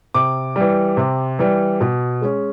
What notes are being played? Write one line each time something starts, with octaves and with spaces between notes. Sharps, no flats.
C3 D6
E3 G3
C3
E3 G3
B2
G#3 C#4